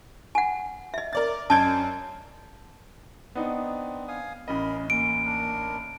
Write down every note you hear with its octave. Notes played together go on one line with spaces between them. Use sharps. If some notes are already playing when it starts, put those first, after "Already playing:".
F#5 G#5
D#5 E5
A#4 D5 A6
F#2 D5 D#5 A5 G6 D7
B3 C4 D4 D#4
F5 G#5 D#6
A1 C#4 A#4 D#5 B5
A#3 C#4 D7
D4 A#4